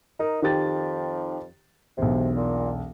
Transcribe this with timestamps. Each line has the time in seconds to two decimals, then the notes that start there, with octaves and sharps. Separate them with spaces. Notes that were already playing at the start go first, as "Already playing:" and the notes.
0.19 D#4 A#4
0.42 F2 D#3 G4 A6
1.98 E1 B1 C3
2.36 A#2